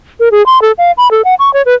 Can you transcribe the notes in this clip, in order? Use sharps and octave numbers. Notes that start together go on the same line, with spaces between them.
A#4
G#4
C6
A4
F5
B5
A4
F#5
C#6
C#5
B4